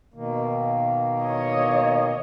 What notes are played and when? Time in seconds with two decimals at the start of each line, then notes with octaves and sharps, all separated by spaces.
0.14 B2 D#3 A#3
1.23 C#5 D#5